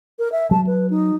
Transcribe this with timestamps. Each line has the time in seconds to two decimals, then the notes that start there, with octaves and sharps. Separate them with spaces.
0.19 A#4
0.32 E5
0.51 F#3 A5
0.67 B4
0.90 D#4